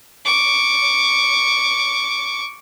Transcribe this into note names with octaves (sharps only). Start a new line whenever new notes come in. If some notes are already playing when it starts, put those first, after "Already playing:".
C#6 D6